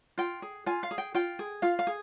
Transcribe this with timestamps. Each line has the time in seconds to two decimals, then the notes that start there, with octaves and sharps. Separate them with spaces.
0.18 F4 G5
0.42 G#4
0.66 F4 G#5
0.83 F5
0.91 G#4
0.98 G5
1.14 F4 G5
1.39 G#4
1.62 F4 F5
1.79 F5
1.87 G#4